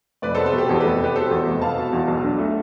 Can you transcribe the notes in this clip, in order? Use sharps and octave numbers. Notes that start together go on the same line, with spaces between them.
F1 B4 D5
B3 A4 C5
A4
B2 G4
E2 A4
F1 G4 B4
B3 G4 B4
B2 A4 C5
E2
F1
B3 F5 A5
B2
E2
B1
D4
A3